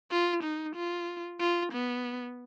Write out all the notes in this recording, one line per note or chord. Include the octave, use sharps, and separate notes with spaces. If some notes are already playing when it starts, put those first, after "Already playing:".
F4
D#4
F4
F4
B3